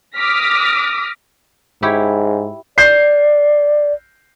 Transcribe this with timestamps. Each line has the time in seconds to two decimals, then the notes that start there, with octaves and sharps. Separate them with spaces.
0.17 D6 D#6 F6 A#6 B6
1.83 G#2 E4 G4 C#5
2.78 D5 G6 C7